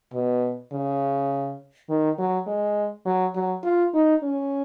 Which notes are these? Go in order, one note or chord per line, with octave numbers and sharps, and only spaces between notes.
B2
C#3
D#3
F#3
G#3
F#3
F#3
F4
D#4
C#4